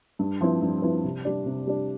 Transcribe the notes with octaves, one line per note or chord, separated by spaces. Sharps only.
G2
F3 C4 E4 B4
G2
F3 C4 E4 B4
C3
G3 D4
C3
G3 D4